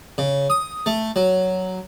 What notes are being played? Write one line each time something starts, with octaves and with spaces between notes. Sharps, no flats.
C#3
D#6
A3
F#3